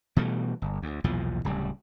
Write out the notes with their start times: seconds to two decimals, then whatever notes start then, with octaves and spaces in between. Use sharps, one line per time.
0.16 B2 E3 G3 A3
0.62 G1
0.82 D2
1.04 B1 E2 A#2 F3
1.45 D1 C#3 G3